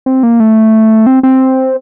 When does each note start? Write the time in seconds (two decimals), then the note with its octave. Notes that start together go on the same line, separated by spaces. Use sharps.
0.06 C4
0.23 A#3
0.40 A3
1.07 C4
1.23 C4